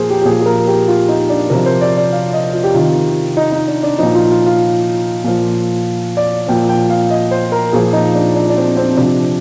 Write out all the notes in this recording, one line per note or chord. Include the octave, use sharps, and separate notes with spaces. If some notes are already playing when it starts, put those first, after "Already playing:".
Already playing: A#2 F3 G#4 A#4 C5
G4
G4
A#2 F3 G#4
G#4
A#4
G4
F4
D#4
D4
C3 F3 A#4
C5
D5
D5
F5
D#5
F4
G4
C3 D#3 F4
D#4
D#4
D4
D4
A#2 F3 D#4
F4
F4
F4
A#2 F3
D5
A#2 F3 G5
G5
F5
D#5
C5
A#4
A#2 F3 G#4
D#4
D4
D4
D4
C4
C4
C3 F3 D4